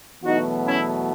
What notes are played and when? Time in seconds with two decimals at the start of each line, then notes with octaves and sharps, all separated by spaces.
0.23 E2 B2 F#3 A3 D#4 F#4
0.66 C#4 E4